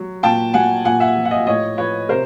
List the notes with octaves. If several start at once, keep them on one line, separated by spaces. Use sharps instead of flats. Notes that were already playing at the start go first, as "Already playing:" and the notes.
Already playing: F#3
A#2 G5 A5
F#3 F#5 G#5
A#2 F#5 G#5
E5 F#5
F3
F#5
D#5 F5
A2 C#5 D#5
F3 B4 C#5
C3 A#4 C5